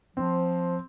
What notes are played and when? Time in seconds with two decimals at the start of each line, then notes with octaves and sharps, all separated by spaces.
0.17 F3 C4